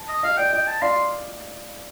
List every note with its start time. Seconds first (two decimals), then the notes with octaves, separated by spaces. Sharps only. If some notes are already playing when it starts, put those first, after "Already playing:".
Already playing: A5
0.09 D#5
0.23 D#5 F5
0.37 D5 G5
0.53 D#5 G5
0.67 A5
0.82 D5 F5 C6